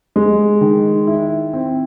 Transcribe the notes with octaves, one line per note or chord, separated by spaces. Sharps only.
G#3
D#3
E4
C4